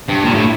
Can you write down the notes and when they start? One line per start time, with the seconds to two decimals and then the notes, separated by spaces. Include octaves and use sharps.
0.09 G2
0.24 A#2
0.34 A2